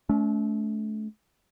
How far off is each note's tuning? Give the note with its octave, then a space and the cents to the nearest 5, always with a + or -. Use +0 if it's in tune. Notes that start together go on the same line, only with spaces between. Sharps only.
A3 -30 C#4 +40